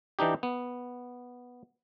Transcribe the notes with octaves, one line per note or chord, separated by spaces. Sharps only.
E3 D4 D#4 G4
B3